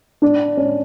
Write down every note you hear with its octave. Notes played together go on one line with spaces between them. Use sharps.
D4
C#4